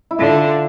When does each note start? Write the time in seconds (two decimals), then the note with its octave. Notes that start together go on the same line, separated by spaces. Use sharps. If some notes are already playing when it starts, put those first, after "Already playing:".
0.11 E4
0.19 D3 F4